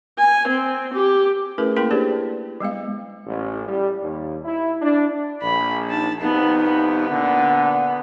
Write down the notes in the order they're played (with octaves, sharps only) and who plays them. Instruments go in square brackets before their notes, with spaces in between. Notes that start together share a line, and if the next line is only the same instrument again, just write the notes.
[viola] G#5
C4
G4
[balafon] A3 C#4 E4 G#4 A#4 B4
A#3 E4 A#4 G5 A5 C6
D4 G4 G#4 B4 C5 D5
G3 G#3 B3 F5
[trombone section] A1
G3
D#2
E4
D4
[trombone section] A#1 [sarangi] B5
[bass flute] D#4 [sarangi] A5
[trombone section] C2 F2 C3 [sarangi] B3 [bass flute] D#4
[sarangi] B3
[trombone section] A#2 D3 [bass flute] F#5